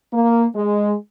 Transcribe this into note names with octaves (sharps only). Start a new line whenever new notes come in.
A#3
G#3